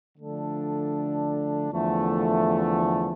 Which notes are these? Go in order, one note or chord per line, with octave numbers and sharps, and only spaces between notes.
D3 F3 A3 D4 A4
E2 D3 F3 A3